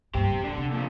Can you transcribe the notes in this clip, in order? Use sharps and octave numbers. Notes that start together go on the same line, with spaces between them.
G2 A#2 G4 C5
E1
D3 D4
C3
A#2 F3